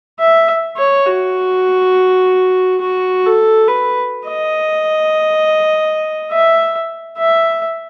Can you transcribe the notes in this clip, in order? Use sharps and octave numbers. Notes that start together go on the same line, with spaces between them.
E5
C#5
F#4
F#4
A4
B4
D#5
E5
E5